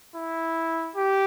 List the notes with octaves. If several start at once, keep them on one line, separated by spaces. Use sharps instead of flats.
E4
G4